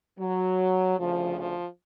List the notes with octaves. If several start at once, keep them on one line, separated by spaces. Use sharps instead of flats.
F#3
D2 C#3 F3
F3